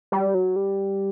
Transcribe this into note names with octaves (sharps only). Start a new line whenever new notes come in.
G3
F#3
G3